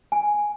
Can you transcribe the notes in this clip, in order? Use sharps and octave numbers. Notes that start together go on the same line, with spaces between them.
G#5